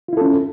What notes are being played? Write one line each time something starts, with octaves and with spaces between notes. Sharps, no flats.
C#4 E4 F4 A4